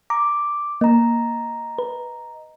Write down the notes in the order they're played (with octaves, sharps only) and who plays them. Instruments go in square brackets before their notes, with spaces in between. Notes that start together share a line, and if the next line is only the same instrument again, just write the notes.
[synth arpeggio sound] A#5 [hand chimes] D6
[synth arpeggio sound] A#3 [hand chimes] D#5 A#5
[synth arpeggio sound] B4